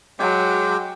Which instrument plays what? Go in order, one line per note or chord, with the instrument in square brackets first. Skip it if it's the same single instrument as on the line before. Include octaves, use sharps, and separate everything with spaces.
[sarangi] F#3 [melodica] G#3 G5 D6